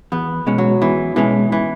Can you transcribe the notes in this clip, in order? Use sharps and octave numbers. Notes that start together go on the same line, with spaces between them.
E2 B3
B2 G#3 C#4
F#3
E2 E3
B2 E3 G#3 C#4
E3